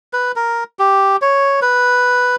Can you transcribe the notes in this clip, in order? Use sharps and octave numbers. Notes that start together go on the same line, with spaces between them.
B4
A#4
G4
C#5
B4